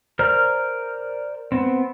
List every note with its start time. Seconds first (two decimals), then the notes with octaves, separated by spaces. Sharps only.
0.19 A#4 C5 D5 A#5 F6
1.52 B3 C4